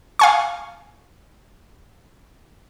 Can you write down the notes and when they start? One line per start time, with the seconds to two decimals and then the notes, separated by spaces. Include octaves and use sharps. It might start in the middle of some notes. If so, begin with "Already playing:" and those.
0.19 F5 G#5 C#6